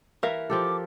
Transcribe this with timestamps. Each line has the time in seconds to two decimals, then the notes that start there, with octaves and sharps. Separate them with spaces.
0.23 E3 A#4 E5 F5
0.50 F3 G4 A4 D6